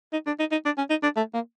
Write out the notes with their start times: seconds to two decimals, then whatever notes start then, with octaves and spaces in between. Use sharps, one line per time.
0.13 D#4
0.26 D4
0.39 D#4
0.52 D#4
0.65 D4
0.77 C#4
0.90 D#4
1.03 D4
1.17 A3
1.34 A#3